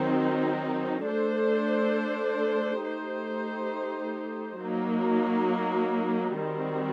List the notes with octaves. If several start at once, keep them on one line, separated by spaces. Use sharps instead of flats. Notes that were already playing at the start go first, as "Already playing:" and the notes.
Already playing: D#3 F#3 C4 D#4
A3 D4 A4 C5
A3 D#4 G4 C5
F#3 A#3 D#4
D#3 G3 C4 F#4